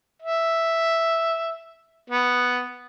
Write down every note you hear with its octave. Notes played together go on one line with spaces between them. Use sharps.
E5
B3